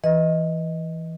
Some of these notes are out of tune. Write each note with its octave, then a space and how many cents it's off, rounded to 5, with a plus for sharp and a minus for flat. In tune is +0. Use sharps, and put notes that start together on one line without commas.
E3 +0 B4 +0 D#5 +5